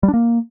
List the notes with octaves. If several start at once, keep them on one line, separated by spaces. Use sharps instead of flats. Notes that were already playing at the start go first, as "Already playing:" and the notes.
G3
D4
A#3